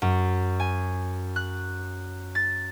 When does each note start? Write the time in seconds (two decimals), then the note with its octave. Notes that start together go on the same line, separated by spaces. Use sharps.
0.02 F#2
0.60 G#5
1.36 F#6
2.35 A6